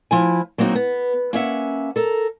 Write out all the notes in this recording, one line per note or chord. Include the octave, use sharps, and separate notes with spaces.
F3 E4 G#5
F#3 A#3 C4 D#4 F#4
B3
A#3 C#4 E5 F#5
A4 A#4